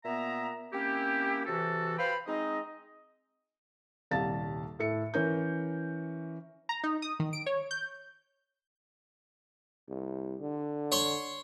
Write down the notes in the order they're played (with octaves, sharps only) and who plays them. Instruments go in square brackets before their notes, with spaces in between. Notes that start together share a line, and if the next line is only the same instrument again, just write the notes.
[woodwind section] A#2 B3 E5 A#5
A#3 C4 C#4 E4 G4
C3 E3 F#4 A4
B4 C5 F5 G5 B5
G#3 C4 D#4 D#5
[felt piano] D#1 C2 F5 A5 A6
A2 A4 C#7
E3 C#4 A#4 G6
[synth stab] A#5
D#4
D#6
D#3
D7
C#5
G6
[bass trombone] C2
D3
[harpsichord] C#5 C6